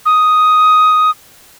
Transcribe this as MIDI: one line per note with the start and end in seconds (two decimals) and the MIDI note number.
0.06 1.10 87